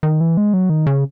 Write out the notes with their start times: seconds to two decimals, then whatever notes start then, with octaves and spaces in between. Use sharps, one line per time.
0.03 D#3
0.21 E3
0.37 G#3
0.53 F#3
0.70 D#3
0.87 C#3